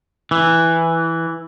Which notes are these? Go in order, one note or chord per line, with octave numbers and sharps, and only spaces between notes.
E3